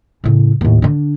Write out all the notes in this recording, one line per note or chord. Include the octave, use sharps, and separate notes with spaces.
A2 C#3
D#2 A2
D3 D4